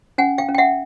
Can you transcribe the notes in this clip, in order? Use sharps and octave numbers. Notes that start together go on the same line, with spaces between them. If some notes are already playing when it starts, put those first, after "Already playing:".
C#4 F#5 G#5
F5 G5
C#4
G5
E5 F#5